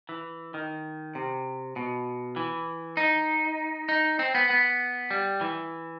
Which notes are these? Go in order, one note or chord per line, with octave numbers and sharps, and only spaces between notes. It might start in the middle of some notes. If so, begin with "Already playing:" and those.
E3
D#3
C3
B2
E3
D#4
D#4
C4
B3
B3
G3
E3